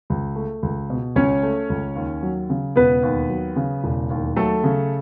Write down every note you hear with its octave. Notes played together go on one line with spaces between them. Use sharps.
C#2
A3
C#2
B2
C#2 C#4 C#5
A3
C#2
D#2
F#3
C#3
E1 B3 B4
D#2
F#3
C#3
E1
D#2
F#3 A3 A4
C#3